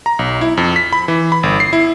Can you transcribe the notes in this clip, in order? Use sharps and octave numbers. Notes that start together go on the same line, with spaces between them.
A#5
B1
E4
F2
B6
B5
E3
B5
G1
C7
E4